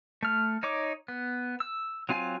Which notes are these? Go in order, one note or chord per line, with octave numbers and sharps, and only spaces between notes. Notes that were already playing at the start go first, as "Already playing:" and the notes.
A3 F6
D#4 C#5 D6
B3
E6
F#3 C4 F4 F5 G#5